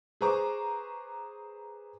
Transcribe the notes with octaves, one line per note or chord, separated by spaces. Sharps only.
G#4 B4 C5 A#5 C#6 D6